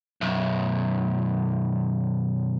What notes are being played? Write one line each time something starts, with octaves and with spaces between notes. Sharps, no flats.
B1 F#2